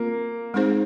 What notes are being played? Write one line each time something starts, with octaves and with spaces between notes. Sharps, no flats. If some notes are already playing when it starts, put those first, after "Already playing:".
Already playing: A#3 C4 F4
G#3 C4 D#4 G#4 C5